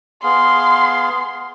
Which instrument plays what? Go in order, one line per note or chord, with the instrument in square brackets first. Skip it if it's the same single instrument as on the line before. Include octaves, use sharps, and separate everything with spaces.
[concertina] B3 G#4 F5 [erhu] C6